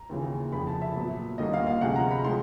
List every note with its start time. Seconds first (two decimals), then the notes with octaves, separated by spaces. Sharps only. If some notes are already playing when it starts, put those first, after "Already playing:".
Already playing: A#5
0.09 D#2 C#3 E3
0.52 F1 F2 C#3 F3 B5
0.67 A5
0.82 E5
0.96 A#2 F#3 B3
1.38 D#2 D3 G3 A#3 D#5
1.53 F5
1.67 F5
1.81 D2 C3 F3 G#3 C#4 F#5
1.96 A#5
2.11 B5
2.24 A2 F3 G#3 C6